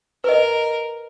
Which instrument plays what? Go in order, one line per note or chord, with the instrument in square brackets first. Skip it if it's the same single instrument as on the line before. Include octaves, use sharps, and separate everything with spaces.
[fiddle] A#4 [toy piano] B4 D#5